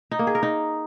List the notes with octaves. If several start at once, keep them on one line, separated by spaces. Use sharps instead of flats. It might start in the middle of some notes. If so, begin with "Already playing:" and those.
D#4
A#3
G#4
A#4
D#4